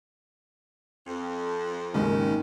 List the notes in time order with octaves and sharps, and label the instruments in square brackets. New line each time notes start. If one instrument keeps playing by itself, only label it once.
[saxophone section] F2
[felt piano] F#1 D#2 G#2 [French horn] D#3 [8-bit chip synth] G#3 C#4